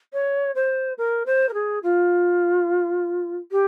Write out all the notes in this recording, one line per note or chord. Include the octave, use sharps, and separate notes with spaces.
C#5
C5
A#4
C5
A#4
G#4
F4
G4